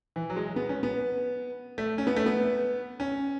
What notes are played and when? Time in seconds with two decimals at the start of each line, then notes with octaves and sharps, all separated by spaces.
0.16 E3
0.30 F#3
0.36 G#3
0.56 B3
0.69 C#4
0.83 B3
1.78 A3
1.98 C#4
2.07 B3
2.16 A3
2.26 B3
3.00 C#4